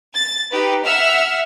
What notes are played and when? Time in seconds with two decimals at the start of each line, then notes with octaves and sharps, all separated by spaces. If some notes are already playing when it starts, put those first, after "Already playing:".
0.14 A6
0.50 D#4 G4 B4
0.84 E5 F#5 E6 F6